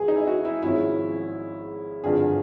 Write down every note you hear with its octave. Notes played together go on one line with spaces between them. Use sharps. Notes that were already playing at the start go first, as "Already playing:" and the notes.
Already playing: A1 F3 G#4
D#4
E4
F#4
E4
G#1 G#2 F3 G#3 C#4 E4
G#1 G2 D3 F3 G#4